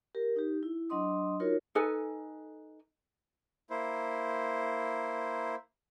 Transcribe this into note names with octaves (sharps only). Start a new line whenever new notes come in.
G4 A#4
D#4 G4
E4
F#3 D4 D#5 C6 D#6
D#4 F4 F#4 A#4 C#5
D#4 A4 B4 G#5
A#3 E4 C5